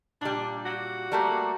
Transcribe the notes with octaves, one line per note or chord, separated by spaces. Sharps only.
A#2 G3 D4
F#4
G3 A3 A#3